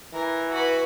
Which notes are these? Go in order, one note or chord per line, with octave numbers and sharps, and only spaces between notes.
E3 A#4
F#4 B4